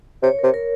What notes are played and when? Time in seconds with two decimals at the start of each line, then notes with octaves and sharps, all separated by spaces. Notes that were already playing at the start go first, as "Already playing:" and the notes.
0.23 C3 C#5
0.39 C3 A#4
0.54 A#4